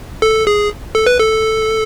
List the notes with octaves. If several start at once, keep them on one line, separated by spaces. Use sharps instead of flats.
A4
G#4
A4
B4
A4